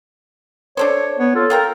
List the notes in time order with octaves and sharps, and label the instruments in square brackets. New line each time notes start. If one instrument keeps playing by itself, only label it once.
[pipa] D4 A4 C5 [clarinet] C#5
[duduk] B3 [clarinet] C#5
[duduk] F4 [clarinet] A4
[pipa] F4 G5 A#5 [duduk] A#4